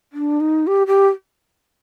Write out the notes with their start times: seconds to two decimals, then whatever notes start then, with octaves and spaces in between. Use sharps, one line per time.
0.13 D4
0.40 D#4
0.67 G4
0.87 G4